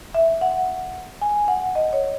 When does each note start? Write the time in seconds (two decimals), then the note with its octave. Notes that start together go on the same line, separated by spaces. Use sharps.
0.15 E5
0.41 F#5
1.22 G#5
1.48 F#5
1.75 D#5
1.93 C#5